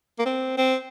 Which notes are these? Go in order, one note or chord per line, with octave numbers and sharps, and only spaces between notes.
A#3
C4
C4